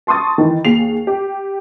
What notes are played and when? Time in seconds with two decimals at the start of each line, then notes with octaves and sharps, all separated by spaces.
0.07 A5 C6 C#6 D#6 A6
0.38 D#3 E3
0.65 D#2 G#4 C7 F7
1.07 G4